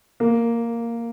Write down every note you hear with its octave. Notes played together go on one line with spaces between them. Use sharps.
A#3